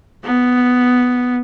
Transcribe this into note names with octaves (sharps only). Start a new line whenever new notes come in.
B3